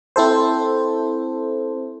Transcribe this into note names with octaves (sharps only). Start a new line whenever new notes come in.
C4 E4 A4 C5